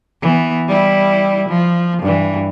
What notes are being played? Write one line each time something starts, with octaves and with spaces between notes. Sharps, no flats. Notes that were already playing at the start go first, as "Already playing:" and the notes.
E3 B3
G3 E4
F3
G2 E3